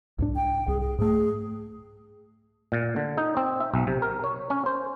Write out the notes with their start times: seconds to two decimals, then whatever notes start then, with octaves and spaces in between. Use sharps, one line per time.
0.19 C2 G#2 D4
0.36 G5
0.68 C2 G#4
0.80 G#4
0.98 G#2 A3 G#4
2.72 A#2
2.96 D3
3.18 D#4
3.37 C4
3.60 E5
3.74 B1
3.87 C3
4.02 A#4
4.24 C#5
4.50 C#4
4.66 C5